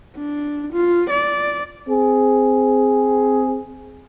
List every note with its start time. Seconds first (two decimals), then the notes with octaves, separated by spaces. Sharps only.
0.16 D4
0.73 F4
1.10 D5
1.87 C4 G#4